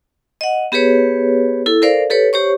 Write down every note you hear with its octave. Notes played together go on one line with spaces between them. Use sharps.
D#5 F#5
B3 G4 G#4 B4 C#5
E4 A4
A4 A#4 C5 D5 F5
G4 A4 B4 C#5
G4 C5 C#5 C#6